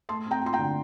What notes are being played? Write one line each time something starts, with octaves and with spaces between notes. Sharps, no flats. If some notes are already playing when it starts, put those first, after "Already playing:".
A3 A5 C6
C4
G5 A#5
F4 C6
G5 A#5
D3